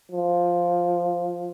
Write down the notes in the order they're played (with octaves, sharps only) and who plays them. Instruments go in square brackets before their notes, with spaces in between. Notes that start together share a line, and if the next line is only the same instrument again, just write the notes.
[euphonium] F3